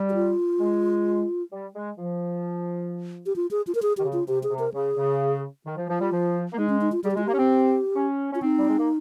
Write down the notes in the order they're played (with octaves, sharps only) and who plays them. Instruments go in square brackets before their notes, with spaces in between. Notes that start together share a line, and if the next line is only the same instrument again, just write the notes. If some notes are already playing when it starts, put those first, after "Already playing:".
Already playing: [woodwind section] G3
[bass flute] G4
F4
[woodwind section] G#3
G3
G#3
F3
[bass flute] G4
F4
G#4
F4
A#4
G#4
[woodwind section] D#3 [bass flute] G4
[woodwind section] C#3
[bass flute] F4
[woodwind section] C3 [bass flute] G4
[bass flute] G#4
[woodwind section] C3
[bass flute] A#4
[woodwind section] C#3 [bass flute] G#4
[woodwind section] C#3
D#3
F3
[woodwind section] F3 [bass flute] F4
[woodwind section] G3
F3
A#3
[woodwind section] G#3 [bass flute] D#4
[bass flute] C#4
D#4
F4
[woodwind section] G3 [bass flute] G#4
[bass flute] G4
[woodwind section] G#3 [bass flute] F4
[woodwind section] A#3 [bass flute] G4
[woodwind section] C#4
C4
C#4
[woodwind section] C#4 [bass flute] F4
[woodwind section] C4 [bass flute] D#4
[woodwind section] G3
G#3
A#3